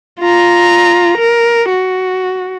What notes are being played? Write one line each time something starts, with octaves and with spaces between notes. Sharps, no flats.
F4 A#5
A#4
F#4